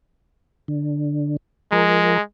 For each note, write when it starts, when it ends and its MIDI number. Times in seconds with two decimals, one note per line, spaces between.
0.68 1.37 50
1.72 2.18 53
1.72 2.22 56
1.72 2.18 70